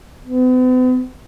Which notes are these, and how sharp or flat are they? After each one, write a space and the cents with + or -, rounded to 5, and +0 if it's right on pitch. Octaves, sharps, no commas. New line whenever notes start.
B3 +45